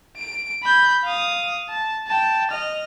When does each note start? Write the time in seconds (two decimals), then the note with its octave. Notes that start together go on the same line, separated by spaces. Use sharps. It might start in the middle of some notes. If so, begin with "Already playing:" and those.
0.17 D7
0.63 B5 G6
1.05 F5 D#6
1.69 A5
2.07 G5 A5
2.51 D#5 F6